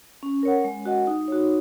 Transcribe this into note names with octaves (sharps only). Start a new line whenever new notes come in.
C#4
A#4 C#5 F#5
G#3
F#4 D#5 F#5
D#4
F#4 C#5